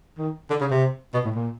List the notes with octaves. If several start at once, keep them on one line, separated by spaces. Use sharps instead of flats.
D#3
D3
C#3
C3
B2
A2
A#2